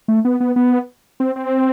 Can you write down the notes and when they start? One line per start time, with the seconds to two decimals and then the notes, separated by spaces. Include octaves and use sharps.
0.08 A3
0.25 B3
0.40 B3
0.56 B3
1.20 C4
1.36 C4